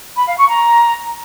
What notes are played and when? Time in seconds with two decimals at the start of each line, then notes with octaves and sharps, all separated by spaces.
0.16 B5
0.27 F5
0.37 C#6
0.48 A#5